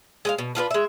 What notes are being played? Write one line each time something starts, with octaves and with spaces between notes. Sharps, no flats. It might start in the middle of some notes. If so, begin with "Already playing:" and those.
G#3 D#5 F5
B2
D4 F4 G4 B4
G#3 E5